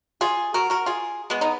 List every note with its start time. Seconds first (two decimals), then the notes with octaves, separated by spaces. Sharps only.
0.21 F4 G#4
0.54 F#4 A#4
0.70 F#4 A#4
0.86 F4 G#4
1.30 G#3 B3
1.41 B3 D#4